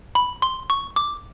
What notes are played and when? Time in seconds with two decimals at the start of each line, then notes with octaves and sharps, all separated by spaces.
0.15 B5
0.42 C6
0.70 C#6
0.96 D6